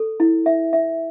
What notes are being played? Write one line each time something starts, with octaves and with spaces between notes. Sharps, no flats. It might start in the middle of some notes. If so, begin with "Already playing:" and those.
Already playing: A4
E4
E5
E5